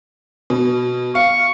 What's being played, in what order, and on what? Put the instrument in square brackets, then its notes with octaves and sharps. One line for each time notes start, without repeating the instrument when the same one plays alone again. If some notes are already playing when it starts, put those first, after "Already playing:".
[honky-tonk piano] B2
[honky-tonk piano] F5 [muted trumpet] C#6